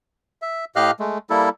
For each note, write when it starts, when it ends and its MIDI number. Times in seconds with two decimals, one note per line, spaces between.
0.42 0.65 76
0.76 0.91 45
0.76 0.91 67
0.76 0.91 75
0.76 0.91 77
0.76 0.91 89
0.76 0.91 90
0.99 1.18 56
0.99 1.18 57
1.30 1.49 55
1.30 1.49 58
1.30 1.49 64
1.30 1.49 69